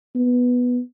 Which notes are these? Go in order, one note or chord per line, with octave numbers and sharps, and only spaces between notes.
B3